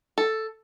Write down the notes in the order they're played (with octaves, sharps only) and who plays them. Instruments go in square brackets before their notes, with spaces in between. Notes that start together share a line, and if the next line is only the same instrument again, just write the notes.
[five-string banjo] A4